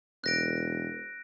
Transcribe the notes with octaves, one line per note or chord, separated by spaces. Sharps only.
E1 F#6 A#6 D7